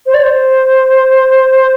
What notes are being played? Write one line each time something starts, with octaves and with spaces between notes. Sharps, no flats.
C5
D5
C5